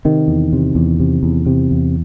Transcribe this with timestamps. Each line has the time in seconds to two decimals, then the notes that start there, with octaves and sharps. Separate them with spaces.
0.05 C3 D#3
0.28 E2
0.53 C3
0.75 E2
1.00 C3
1.23 E2
1.46 C3
1.71 E2